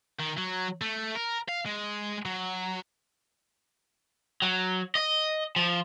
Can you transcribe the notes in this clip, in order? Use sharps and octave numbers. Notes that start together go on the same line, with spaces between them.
D#3
F#3
A3
A#4
F5
G#3
F#3
F#3
D#5
F3